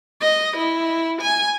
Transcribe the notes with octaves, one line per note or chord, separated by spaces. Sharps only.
D#5
E4
G#5